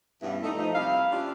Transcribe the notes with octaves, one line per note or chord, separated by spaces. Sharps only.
G2 B2 E3 B3 C#4 E4
A3 D#4
F3 D#4
C3 G3 A#3 E4 F5
C#4 D4 E4 F4 G4 D5